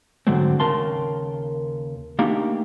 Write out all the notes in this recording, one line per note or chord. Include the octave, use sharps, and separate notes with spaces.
G#2 D3 F#3 G#3 A3 C4
D#2 C#3 A#4 A5 C6
A3 A#3 D4 D#4 G4